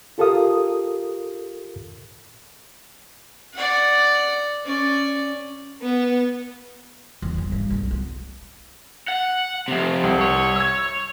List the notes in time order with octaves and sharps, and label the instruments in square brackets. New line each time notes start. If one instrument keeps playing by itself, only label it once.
[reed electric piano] F4 G4 A4 A#4 F5 D#6
[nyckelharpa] D5 F#5
C#4 D5
[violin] B3
[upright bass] E2
F#3 G3
G2
B1 F#3
B3
[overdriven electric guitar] F#5
F2 C3
[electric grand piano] C2
[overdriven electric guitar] C#5
[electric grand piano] E6 G#6